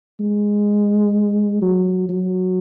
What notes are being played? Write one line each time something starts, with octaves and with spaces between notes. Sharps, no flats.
G#3
F#3
F#3